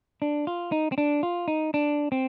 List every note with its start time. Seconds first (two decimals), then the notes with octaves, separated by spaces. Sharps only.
0.22 D4
0.47 F4
0.72 D#4
0.92 C4
0.98 D4
1.23 F4
1.48 D#4
1.74 D4
2.12 C4